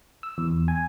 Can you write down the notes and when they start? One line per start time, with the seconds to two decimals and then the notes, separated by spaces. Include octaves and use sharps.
0.23 E6
0.38 E2
0.68 G#5